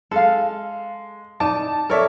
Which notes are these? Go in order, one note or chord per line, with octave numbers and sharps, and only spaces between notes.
G#3 A4 F5
D#4 D5 A5
A4 A#4 C#5 D5 E5